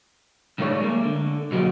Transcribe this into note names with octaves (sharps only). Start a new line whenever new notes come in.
C2 A2 D#3 G#3 D4 C#5
G#3 A#3
D3
B1 F#3 G#3 A#3 F#4 D#5